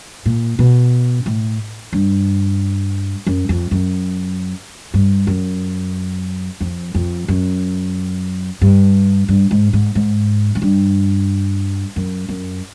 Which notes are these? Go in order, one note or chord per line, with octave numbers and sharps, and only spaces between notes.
A#2
B2
A2
G2
F#2
F2
F#2
G2
F#2
F2
F2
F#2
G2
G2
G#2
G#2
G#2
G#2
G2
F#2
F#2